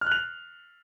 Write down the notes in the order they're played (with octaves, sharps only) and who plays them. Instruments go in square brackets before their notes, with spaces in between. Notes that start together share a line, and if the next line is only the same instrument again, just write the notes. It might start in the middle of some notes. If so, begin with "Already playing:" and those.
[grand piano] F6
F#6
F7